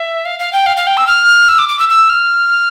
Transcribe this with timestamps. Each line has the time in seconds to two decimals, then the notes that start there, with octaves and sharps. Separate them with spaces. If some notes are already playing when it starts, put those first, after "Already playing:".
Already playing: E5
0.25 F5
0.39 F5
0.53 G5
0.66 F5
0.77 F5
0.87 G5
0.97 E6
1.07 F6
1.48 E6
1.58 D6
1.69 D6
1.79 E6
1.89 E6
2.09 F6